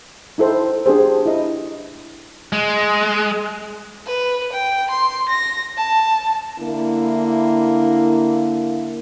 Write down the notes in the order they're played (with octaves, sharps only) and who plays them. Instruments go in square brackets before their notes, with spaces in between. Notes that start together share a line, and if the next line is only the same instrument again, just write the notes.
[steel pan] D#4 E4 A4 C5
D4 G4 G#4 C5
E4 D#5
[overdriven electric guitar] G#3
[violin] B4
G5
C6
A#6
A5
[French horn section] D3 A#3 E4